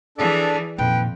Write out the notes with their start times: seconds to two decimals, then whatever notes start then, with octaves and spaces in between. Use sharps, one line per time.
0.18 E3 D4 G#4 A4 D5
0.78 F2 A#2 D#3 B4 G5